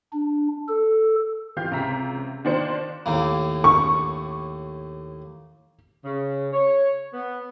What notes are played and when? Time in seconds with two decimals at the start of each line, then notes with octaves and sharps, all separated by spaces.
0.13 D4
0.68 A4
1.57 E3 F4 G4 F5 G6
1.71 C#2 C3 E5 A#5 B6 C7
2.45 D#3 A#3 D4 F4 C5 C#7
3.06 D#2 A2 A#3
3.64 C#6
6.04 C#3
6.53 C#5
7.13 B3